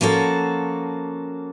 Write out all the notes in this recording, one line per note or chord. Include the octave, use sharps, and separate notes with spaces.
F3 A#3 C#4 F#4 A4